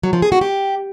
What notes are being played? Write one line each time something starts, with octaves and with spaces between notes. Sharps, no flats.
F#3
F3
G#4
F#4
G4